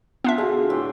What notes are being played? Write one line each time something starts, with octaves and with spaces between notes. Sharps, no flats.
B3 D4 F4 E5
D3 F#4 G#4
A2 E3 G5